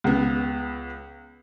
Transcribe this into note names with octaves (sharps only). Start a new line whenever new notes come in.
C#2 B3